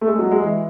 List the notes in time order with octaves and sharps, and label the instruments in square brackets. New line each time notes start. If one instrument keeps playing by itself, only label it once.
[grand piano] A3
G#3
F#3
G#3
E3